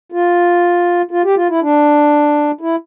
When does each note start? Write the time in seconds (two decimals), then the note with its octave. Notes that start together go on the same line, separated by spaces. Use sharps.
0.12 F4
1.11 F4
1.24 G4
1.36 F4
1.49 E4
1.62 D4
2.61 E4